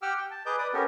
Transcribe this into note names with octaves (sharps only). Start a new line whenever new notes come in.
G4 F#5 G5 D6 E6 F6
G5
A5
G#4 B4 D#5 A#5 D6 G6
B4 D5 D6 D#6
B3 C#4 G4 A4 A#4